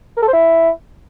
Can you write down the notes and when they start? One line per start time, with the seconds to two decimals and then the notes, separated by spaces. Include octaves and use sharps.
0.17 A#4
0.22 A4
0.28 C5
0.33 E4